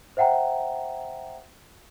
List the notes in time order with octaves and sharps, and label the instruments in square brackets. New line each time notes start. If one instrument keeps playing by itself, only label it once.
[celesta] C5 E5 F#5 G5 A#5